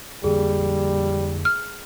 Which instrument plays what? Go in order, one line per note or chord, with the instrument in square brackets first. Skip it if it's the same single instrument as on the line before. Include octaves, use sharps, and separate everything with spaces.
[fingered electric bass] F2 D3 A#3 [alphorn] G3 [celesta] G#4
[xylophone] F6